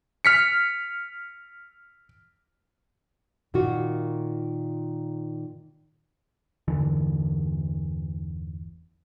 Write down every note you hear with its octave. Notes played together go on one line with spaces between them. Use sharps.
F6 B6 C#7
A#2 D#3 A#3 F4 F#4
G1 E2 D3 E3